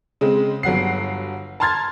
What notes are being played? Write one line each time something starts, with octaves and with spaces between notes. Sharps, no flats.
C#3 G#3 C4
G1 F#3 F#5 C7
A5 A#5 C6 F6 G#6 A6